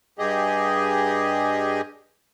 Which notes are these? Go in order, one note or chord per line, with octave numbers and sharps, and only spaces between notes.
G2 G4 G#4 D#5